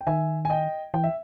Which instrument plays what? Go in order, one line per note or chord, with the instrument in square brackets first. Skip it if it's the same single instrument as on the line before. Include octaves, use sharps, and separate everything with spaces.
[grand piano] G5
[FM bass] D#3 [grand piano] E5 G#5
[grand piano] G#5
D#5 G5
[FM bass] E3 [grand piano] G5
[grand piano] E5